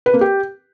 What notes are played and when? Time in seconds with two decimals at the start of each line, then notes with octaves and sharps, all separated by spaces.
0.06 B4
0.14 A#3
0.21 G4